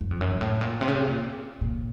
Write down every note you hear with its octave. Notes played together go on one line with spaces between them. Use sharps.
F#2
F2
F#2
G#2
A2
A#2
C3
C#3
C3
A#2
A#2